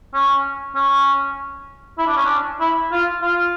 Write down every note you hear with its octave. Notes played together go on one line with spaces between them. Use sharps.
C#4
C#4
E4
D4
C#4
D4
E4
F4
F4